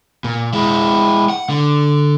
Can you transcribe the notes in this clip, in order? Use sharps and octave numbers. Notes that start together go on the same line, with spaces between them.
A#2
G#3 E4
F#5
D3